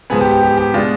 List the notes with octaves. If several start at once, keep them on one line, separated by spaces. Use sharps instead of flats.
G#2 F3 B3 G#4
G4
G4
G4
G4
B2 G#3 D4 F4